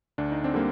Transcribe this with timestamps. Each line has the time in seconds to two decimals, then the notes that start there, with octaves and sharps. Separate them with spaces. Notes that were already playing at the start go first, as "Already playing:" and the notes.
0.18 D2 D4
0.32 D#4
0.44 C4 D4
0.54 D3 G3 A#3